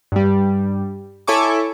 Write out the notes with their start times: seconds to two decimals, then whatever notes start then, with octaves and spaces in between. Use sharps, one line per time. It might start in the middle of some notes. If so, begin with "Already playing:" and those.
0.12 G2 G3
1.27 E4 A4 C#5 G#5 C#6 D6